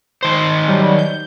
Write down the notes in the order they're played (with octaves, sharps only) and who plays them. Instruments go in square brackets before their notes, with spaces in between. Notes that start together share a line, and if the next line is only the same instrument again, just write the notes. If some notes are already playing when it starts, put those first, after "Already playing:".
[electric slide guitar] D#3 C5
[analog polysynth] F#3 G3
G6